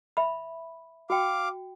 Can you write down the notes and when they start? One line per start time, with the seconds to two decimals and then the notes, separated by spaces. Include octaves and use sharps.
0.17 E5 B5
1.10 F#4 F5 G5 D6